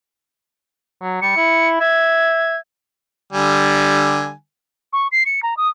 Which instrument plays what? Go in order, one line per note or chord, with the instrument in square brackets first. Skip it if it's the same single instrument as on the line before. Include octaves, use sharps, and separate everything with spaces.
[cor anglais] F#3
[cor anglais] G3 [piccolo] C#7
[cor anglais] E4
[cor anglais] E5 [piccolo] G#6
[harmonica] D3 G3 G#5
[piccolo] C#6
C7
C#7
A#5
D#6